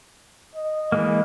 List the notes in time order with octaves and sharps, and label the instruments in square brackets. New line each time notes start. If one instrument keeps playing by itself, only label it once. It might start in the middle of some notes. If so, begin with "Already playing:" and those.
[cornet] D#5
[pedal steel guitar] E3 G#3 A#3